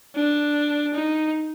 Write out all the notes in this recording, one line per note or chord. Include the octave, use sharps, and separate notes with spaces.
D4
D#4